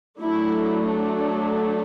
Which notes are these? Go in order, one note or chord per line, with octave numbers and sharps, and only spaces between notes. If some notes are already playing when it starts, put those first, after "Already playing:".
F#3 A3 D4 E4